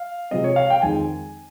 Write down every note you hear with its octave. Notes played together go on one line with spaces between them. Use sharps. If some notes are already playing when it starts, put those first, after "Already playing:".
Already playing: F5
C3 F3 G#3 C4 D#5
C#5
F5
G5
F2 D#3 G#3 C4 G#5